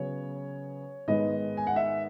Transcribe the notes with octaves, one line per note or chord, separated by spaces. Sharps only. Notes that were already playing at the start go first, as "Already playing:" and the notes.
Already playing: C#3 F#3 B3 C#5
G#2 D#3 G#3 B3 D#5
G#5
F#5
E5